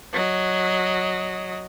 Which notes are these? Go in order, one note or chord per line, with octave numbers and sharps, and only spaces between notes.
F#3 D#5